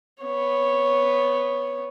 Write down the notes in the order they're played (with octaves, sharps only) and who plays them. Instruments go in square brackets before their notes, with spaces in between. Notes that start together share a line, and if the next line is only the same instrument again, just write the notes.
[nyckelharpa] B3 C#5